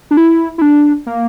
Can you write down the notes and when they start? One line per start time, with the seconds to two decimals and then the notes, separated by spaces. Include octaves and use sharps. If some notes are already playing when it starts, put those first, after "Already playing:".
0.11 D4
0.17 E4
0.58 E4
0.62 D4
1.06 A#3